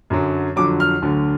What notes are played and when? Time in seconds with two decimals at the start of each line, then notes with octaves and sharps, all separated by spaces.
0.10 F#2 D3 F#3
0.56 F2 D3 F#3 D6
0.80 F6
1.02 D2 D3 F#3